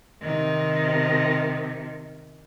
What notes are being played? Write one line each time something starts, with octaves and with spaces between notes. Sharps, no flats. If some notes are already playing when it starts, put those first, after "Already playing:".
C3 D#3